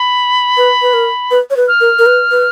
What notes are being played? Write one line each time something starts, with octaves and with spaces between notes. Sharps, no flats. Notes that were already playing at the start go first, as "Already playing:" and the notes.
Already playing: B5
B4
B4
A#4
B4
C#5
B4
F6
A#4
A#4
B4
B4